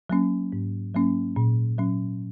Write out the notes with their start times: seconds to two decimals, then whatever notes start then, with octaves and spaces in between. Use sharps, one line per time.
0.10 F#3 A#3 C#4
0.52 G#2
0.94 F#3 A#3 C#4
1.36 A#2
1.78 F#3 C#4